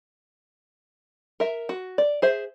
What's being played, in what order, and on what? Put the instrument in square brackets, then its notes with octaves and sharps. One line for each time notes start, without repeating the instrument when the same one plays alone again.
[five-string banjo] A#4 E5
F#4
D5
G#4 C5 E5